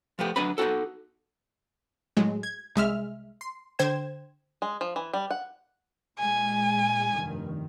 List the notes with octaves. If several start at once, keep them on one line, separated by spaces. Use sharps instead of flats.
F3 A3 B3 G4
D2 F#3 D4 B4 D#5 B5
B3 D#4 F4 F#4 A4
A2 F#3 G#3
G#6
C2 G#3 E5 F6
C6
D3 C5 G5 G#6 E7
G#3
F3
E3
G3
F#5
A#2 G#3 G#5
F1 G2 D#3